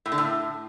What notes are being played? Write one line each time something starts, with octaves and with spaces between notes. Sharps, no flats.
A2
D3
A2